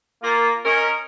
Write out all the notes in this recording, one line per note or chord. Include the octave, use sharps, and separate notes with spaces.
A#3 F4
C#4 A#4 D#5